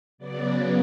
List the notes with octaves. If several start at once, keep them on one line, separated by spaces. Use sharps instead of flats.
C#3 F#3 B3 D5